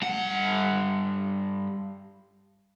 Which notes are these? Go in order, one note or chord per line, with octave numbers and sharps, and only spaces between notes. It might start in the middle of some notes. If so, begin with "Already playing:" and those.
G2 F#5